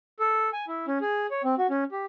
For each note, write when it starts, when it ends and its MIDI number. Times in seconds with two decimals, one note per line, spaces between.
0.20 0.50 69
0.53 0.65 80
0.68 0.86 64
0.88 0.99 61
1.01 1.27 68
1.31 1.42 73
1.44 1.55 60
1.58 1.67 66
1.70 1.84 61
1.92 2.06 67